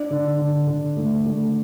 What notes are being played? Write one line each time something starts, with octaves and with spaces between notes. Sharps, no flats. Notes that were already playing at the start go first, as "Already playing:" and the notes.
Already playing: D4
D3
D3
D3
A3
A3